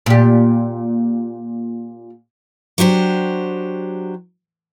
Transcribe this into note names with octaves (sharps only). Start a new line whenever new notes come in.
A#2 G4
F#3 D4 G4 C5